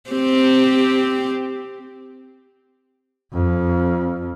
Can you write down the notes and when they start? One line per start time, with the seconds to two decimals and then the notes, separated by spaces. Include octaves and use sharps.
0.10 C4 G4
3.32 F2